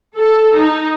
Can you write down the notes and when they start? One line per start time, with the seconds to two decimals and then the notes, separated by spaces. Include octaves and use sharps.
0.16 A4
0.56 D#4